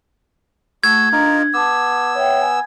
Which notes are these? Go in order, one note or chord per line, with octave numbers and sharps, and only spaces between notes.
A3 F#4 A4 E6 G#6
D4 D#4 F4 A#4
B3 A5 D6 E6
C#5 E5 G5
G#5